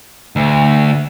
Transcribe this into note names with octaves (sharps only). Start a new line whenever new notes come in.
D2